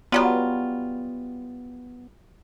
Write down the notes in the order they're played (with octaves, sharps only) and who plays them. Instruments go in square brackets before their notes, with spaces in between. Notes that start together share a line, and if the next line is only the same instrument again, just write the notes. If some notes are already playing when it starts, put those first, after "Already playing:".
[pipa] F#3 G3 F4 [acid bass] B3